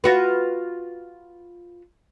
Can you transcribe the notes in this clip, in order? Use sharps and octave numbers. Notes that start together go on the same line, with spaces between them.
F4 F#4 B4